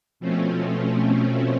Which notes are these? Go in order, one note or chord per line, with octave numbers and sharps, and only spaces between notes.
B2 F3 A3 C4 C#4